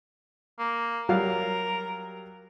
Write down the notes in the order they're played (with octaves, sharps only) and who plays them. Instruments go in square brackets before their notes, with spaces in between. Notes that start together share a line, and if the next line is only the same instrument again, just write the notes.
[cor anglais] A#3
[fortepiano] F#3 G3 F5 [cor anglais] A#4